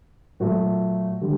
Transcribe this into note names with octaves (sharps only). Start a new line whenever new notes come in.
A#2 F#3 A3 F#4
D3 G3